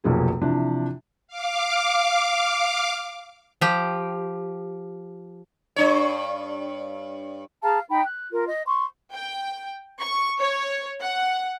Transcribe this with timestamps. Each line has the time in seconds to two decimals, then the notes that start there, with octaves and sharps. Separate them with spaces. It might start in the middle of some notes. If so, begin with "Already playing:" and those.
0.04 F1 B1 F3 A#3 G#4
0.41 C3 E3 F3 D4
1.27 F5 D6
3.61 F3 G4
5.76 G2 D4 C#5
7.63 G#4 F5 A5 A#5
7.90 D#4 G5 B5
8.05 F#6
8.32 F4 A#4
8.48 D#5
8.65 C6 C#6
9.12 G5
10.00 C#6
10.39 C#5
11.01 F#5